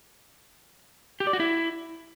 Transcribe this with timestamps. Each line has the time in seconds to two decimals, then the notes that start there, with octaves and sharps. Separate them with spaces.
1.20 G4
1.27 D5
1.33 F#4
1.40 E4